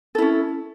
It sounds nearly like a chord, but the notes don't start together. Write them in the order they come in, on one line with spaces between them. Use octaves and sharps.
A4 E4 C#4